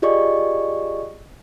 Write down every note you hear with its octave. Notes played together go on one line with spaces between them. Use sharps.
F4 G4 G#4 D5 D#5 C#6